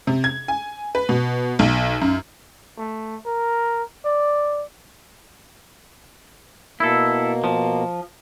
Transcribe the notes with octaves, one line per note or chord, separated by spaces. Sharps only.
C3
G#6
G#5
B4
B2
B1
F#2
A3
A#4
D5
B2 A#3 E4 A4
F3